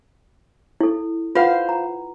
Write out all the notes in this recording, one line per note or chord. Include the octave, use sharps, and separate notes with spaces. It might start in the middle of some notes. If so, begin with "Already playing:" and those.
E4 A4
F4 B4 C5 F5 F#5
A#5